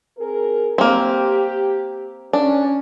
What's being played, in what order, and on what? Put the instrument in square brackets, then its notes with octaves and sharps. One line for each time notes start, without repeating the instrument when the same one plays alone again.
[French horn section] C4 G#4 A#4
[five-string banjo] A#3 C4 [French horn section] G4
[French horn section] C#4 [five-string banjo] D4